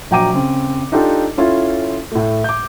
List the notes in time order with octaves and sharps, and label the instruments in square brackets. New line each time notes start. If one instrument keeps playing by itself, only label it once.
[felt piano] A#1 F#3 G5 A#5 D6 D#7
C#3 C4
D4 D#4 F4 G4 A4
C#4 E4 F4 A4
A2 A3
D6 G6